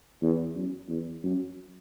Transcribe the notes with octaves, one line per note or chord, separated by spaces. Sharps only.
E2
F#2
E2
F#2